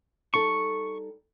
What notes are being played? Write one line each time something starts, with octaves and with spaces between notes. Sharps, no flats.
G3 D#4 A4 C#6